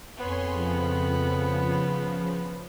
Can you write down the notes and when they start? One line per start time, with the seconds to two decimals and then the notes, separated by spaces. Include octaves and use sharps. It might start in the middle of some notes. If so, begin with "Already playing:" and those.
0.17 F2 B3 C#5 G#5 C6
0.50 C#3 F3